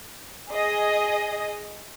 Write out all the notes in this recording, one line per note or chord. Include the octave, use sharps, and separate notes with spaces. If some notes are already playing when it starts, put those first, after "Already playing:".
G#4 D#5